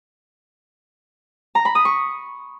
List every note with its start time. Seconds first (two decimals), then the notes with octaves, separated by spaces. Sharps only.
1.55 A#5
1.65 B5
1.75 D#6
1.85 C#6